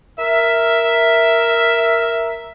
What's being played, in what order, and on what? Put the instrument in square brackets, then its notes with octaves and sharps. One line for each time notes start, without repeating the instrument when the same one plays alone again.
[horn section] A#4 E5